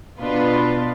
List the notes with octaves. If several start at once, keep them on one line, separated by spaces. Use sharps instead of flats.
B2 B3 D4 F4 B4